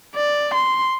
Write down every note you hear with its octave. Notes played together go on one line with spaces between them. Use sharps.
D5
C6